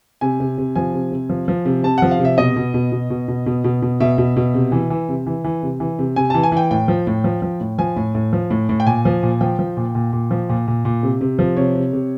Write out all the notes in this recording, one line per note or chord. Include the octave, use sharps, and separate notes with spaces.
C3 G#5
C3
C3
F3 G#5
C3
C3
F3
F3
C3
C3 A5
F3 F#5
F5
C3
E5
B2 D#5
B2
B2
B2
B2
B2
B2
B2
B2
B2 E5
B2
B2
C3
E3
E3
C3
E3
E3
C3
E3
C3
C3 G#5
E3 A5
G#5
E3 G5
A2 G5
F3
A2
F3
F3
A2
F3 G#5
A2
A2
F3
A2
A2
G5
A#2 G#5
F3
A#2
F3 G5
F3
A#2
A#2
A#2
F3
A#2
A#2
A#2
C3
C3
F3
C3 C#5
C3
C3